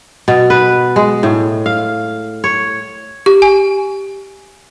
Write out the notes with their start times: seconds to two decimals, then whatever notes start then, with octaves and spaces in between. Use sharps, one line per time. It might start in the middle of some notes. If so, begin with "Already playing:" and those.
0.28 B2
0.50 B4
0.96 G#3
1.23 A2
1.66 F5
2.44 C#5
3.26 G4
3.42 G#5